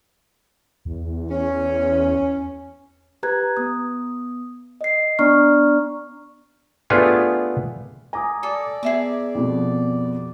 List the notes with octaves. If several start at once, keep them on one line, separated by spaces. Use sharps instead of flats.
E2
C#4
G4 B4 A#5 F#6 G#6
B3 D#6
D#5 C7
B3 D4 D5 A#5 C#6 F6
A3 B3 D4 F4 G4 G#4
G#5 A#5 D6 D#6
A4 D5
B3 G#4 E5 D6
F2 B2